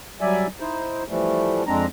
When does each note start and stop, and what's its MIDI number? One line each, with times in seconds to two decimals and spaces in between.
0.21 0.47 54
0.21 0.47 55
0.21 0.47 74
0.21 0.47 76
0.21 0.47 80
0.60 1.03 63
0.60 1.03 64
0.60 1.03 72
1.08 1.63 52
1.08 1.63 53
1.08 1.63 55
1.08 1.63 57
1.67 1.86 41
1.67 1.86 56
1.67 1.86 60
1.67 1.86 62
1.67 1.86 82